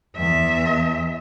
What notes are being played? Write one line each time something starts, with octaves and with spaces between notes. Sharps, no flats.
E2 E5